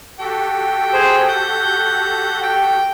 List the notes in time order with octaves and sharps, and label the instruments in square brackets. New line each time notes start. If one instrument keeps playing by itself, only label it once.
[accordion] F#4 G4 A4 [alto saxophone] G5
[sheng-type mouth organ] G#4 C5
[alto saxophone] F#5 [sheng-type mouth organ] G6
[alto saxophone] G5